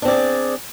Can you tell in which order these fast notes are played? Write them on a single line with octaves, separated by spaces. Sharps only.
D4 C4 D5 G#4